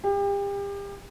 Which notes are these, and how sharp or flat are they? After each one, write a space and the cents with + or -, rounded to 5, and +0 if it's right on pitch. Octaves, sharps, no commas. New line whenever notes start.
G4 +35